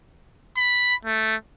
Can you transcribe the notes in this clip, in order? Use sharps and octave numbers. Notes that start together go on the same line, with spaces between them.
B5
A3